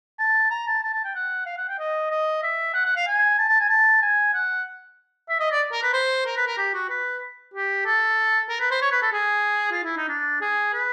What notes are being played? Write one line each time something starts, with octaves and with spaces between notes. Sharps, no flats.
A5
A#5
A5
A5
A5
G5
F#5
F5
F#5
G5
D#5
D#5
E5
F#5
F#5
F5
G#5
A5
A5
G#5
A5
G#5
F#5
E5
D#5
D5
A#4
B4
C5
A#4
B4
A#4
G4
F#4
B4
G4
A4
A#4
B4
C5
C#5
B4
A4
G#4
F4
E4
D#4
D4
G#4
B4